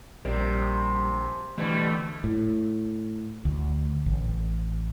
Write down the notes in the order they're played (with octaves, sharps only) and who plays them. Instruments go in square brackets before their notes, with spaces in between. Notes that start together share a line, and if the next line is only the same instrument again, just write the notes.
[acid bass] A#1 [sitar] C3 [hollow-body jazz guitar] G3 A#4 D5
[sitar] B2 G3 [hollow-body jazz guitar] D3 E3 [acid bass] A3
[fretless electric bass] A2
D2
A1